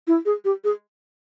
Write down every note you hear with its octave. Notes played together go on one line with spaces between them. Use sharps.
E4
G#4
G4
G#4